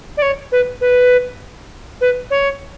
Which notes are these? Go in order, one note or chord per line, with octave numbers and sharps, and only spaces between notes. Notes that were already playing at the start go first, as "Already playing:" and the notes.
D5
C#5
B4
B4
B4
C#5